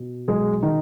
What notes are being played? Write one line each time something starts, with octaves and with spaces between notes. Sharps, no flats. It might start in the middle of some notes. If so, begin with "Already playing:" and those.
Already playing: B2
B1 G#3 G#4
D#3 D#4